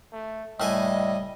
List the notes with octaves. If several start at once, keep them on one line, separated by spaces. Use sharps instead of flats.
A3
F#1 A2 G3 D#5 E5 G#5